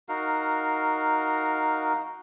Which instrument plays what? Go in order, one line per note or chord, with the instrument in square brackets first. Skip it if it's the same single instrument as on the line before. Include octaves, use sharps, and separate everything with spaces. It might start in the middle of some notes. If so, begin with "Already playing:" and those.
[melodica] D#4 F#4 A#4 F5